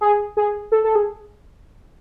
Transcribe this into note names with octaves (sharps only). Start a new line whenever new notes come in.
G#4
G#4
A4
A4
G#4